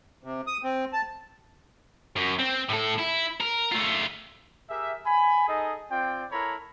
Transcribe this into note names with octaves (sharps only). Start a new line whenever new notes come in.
C3
D#6
C4
A5
F#2
C4
A2 A4
E4
A#4
A3 F4
G4 G#4 A#4 E5
G#5 B5
D#4 G#4 A4 D#5
C4 F4 D5 G5
E4 A4 A#4 C#5 A#5 B5